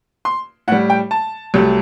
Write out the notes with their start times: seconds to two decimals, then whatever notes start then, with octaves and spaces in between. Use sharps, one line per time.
0.25 C6
0.68 A2 F#5
0.72 G3
0.90 G5
1.11 A5
1.54 C2 C3 F#3 A3